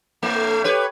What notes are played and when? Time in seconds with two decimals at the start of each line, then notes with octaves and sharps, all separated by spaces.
0.22 A2 A3
0.64 G4 B4 C#5